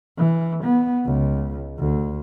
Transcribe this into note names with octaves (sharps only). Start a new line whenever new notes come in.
E3
B3
C#2
D2